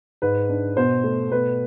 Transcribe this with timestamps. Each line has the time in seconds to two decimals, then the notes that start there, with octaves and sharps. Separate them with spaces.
0.22 G#2 B4
0.49 D4
0.77 B2 C5
1.04 A3
1.32 B2 B4